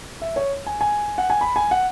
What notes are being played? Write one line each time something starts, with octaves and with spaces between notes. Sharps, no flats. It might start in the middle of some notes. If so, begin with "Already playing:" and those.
E5
C#5
G#5
G#5
F#5
G#5
B5
G#5
F#5